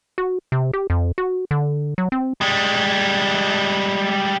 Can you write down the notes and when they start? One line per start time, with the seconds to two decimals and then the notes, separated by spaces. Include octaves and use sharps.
0.18 F#4
0.52 C3
0.73 G4
0.90 F2
1.18 F#4
1.51 D3
1.98 F#3
2.12 C4
2.41 G3 G#3